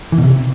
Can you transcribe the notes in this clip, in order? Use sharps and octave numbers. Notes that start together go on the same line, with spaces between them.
E3
B2
C3